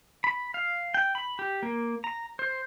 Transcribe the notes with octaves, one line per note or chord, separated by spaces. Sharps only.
B5
F5
G5
B5
G4
A#3
A#5
C5